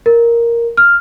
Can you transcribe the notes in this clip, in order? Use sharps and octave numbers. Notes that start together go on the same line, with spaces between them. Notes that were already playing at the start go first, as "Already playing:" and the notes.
A#4
F6